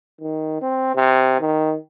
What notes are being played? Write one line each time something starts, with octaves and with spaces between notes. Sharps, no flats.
D#3
C4
C3
D#3